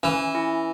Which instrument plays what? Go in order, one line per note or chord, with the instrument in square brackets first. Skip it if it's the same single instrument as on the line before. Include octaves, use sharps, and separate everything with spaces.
[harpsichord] E3 [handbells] C#4
[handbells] E4